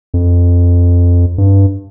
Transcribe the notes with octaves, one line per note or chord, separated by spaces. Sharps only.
F2
G2